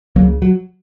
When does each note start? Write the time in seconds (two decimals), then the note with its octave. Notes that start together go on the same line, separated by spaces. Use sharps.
0.16 C#2 F#3 A#3
0.19 C#3
0.42 F#3